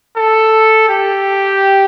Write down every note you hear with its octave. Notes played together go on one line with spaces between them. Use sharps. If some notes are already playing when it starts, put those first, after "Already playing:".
A4
G4